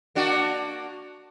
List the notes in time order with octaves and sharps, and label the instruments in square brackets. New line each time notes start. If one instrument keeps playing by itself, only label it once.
[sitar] A#3 D4 F#4